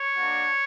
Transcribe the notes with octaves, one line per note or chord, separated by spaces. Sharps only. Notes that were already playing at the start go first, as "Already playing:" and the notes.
Already playing: C#5
A#3 D4 F#4